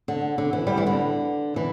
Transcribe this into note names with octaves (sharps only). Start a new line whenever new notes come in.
D3
D3
E3
G3
E3
D3
E3